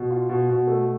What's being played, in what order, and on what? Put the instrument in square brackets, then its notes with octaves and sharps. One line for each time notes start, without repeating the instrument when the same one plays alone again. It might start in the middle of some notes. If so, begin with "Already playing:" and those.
Already playing: [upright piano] B2
F4
B2
B2
A3